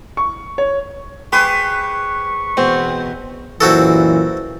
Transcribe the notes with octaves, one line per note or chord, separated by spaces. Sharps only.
C#6
C#5
G4 G#4 B4 C5 C#6
E2 B2 C4
F#2 A#2 E3 C4 F#4 A4